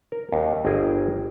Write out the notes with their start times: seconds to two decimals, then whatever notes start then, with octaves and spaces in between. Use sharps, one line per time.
0.12 A#4
0.32 D#2
0.65 G1 G#4 D#5 G5